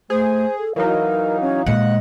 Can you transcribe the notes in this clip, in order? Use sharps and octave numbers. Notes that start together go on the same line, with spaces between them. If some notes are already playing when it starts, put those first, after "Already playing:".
A3 G#4 C5
A4
E3 F#3 D#4 A#4 F5
C#4
A#2 G#3 D#5 F#5